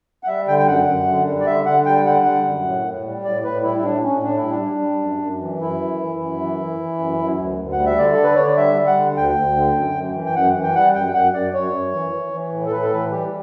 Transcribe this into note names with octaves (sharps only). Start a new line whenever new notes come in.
F#5
G3 E5
D3 G5
G5
F#2 F#5
F#2
D3
G3
D5
D3 E5
D3 F#5
G3 G5
D3 F#5
G3
F#2
A2
A2
G3
A2 D5
A2 B4
G3 E4
E4
A2 D4
A2 C#4
A2 D4
E4
G3
D4
G3
G3
F#2
F#2
E3
F#2 E4
E3
E3
F#2
E3
E3
E3
F#2
F#2
D2
D2
F#5
G3
E5
D3 D5
A4
D3
B4
D3 C#5
D5
G3 E5
G3
F#5
D3
D2 G5
D2
D3
F#2
F#2
E3
G5
F#2 F#5
E3
G5
G3 F#5
F#2 G5
F#2 F#5
F#2 D5
F#2 C#5
F#2
E3
E3
E3
A2
A4
A2 B4
A4
E3 B4
G3 G4